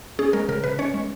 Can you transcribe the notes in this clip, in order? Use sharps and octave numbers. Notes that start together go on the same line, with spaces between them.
C#4 G#4
G#3 A#4
C#3 A#4
C#3 B4
C#4 C#5
G#3